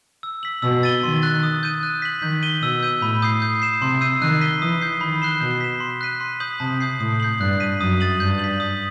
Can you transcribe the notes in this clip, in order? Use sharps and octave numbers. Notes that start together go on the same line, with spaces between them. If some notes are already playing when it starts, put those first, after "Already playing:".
E6
B6 F#7
B2 E6
A6 D#7 G7
D#3 C6
F#6 A6
D#6
G6 D#7
F#6
B6 F#7
D#3 G6
D#7 G7
B2 E6
G6 D#7
A2 B5
D#6 G6 C7
G6
C7 E7
C3 C6
E6 G6 C7 D#7
D#3 F#6
B6 D#7 G7
E3 D#6
G6 C7
D#3 B5
F#6 C7 E7 G7
B2 G6
B6 E7
C6
F#6 B6 D#7
C6
D#6 G6 B6 F#7
C3 A5
D#6 G6 C7
A2 D#6
G6 C7 F#7
G2 F#6
B6 D#7
F#2 D#6
A6 D#7 F#7
G2 G6
B6 F#7
D#6